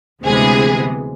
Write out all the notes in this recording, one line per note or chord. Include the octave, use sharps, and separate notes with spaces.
D2 C3 E3 G#3 B3 G#4